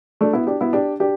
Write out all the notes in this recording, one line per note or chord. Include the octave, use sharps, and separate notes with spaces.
A3 D4
B3 E4
D4 G4
B3 E4
D4 G4
D4 G4